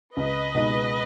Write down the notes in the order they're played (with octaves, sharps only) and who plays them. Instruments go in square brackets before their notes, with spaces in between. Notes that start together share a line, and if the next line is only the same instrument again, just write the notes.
[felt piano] C#2 [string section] B4 D#5
[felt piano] B2 G#3 D#4